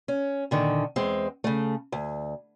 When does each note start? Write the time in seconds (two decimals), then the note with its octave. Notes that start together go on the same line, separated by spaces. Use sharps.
0.08 C#4
0.51 A#2 D3 D#3
0.96 E2 G#3 C4
1.44 C#3 A3
1.92 D2